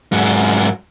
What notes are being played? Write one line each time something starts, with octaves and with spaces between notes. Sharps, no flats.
G#2 F#3